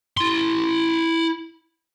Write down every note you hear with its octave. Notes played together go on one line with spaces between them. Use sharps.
E4 C6